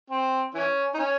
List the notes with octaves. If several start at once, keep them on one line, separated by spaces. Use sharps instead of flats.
C4
E3 C#4
D#4
C#4